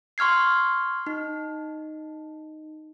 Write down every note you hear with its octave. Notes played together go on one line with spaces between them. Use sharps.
C6 C#6 F6 G#6 C7
D#4